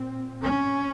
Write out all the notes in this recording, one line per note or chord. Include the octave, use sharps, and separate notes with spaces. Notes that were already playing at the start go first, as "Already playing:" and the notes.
Already playing: A#2 C4
C#4